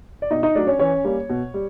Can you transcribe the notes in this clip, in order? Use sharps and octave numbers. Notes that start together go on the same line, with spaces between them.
D5
B2 D#4 D#5
D#4 D#5
F#3 A3 D4 D5
C#4 C#5
E3 C#4 C#5
G3 A#3 C#4
B2
G3